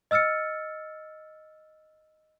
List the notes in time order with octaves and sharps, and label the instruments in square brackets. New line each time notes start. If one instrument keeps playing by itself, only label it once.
[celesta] D#5 E6 F6 A6 C#7